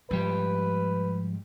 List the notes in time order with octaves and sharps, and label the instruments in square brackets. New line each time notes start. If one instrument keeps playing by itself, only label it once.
[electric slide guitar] G#2 G3 G4 [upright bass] F3 [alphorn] B4